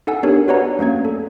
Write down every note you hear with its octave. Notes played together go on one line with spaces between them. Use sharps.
D#4 A4 F#5 G#5 E6
B3 D4 G4 A#4 C#5
F#4 B4 C#5 D5 F#5 A#5
A3 A#3 C#4 G#6
A4